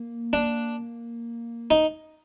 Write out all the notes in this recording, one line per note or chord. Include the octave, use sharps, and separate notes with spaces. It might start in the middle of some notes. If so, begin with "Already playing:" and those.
Already playing: A#3
D4
D#4